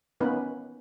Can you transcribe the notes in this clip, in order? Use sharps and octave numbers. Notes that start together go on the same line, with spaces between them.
A#3 B3 C#4 D#4 B4